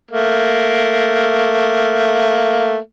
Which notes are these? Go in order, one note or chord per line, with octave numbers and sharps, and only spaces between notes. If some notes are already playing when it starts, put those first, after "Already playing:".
A3 A#3